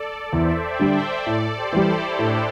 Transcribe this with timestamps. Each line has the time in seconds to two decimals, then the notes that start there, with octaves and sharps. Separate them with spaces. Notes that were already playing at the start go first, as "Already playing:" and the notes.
Already playing: A4 D5
0.33 E2 C5 E5
0.64 D5 G5
0.79 D3 G3
0.94 C5 E5
1.26 A2 A4 D5
1.57 G4 C5
1.72 E3 G3
1.88 E4 A4
2.19 A2 D4 G4